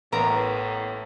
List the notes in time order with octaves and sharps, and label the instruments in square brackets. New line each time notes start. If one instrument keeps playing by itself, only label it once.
[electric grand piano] A1 [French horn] A2 [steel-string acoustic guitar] B3 [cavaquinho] A#4 A#5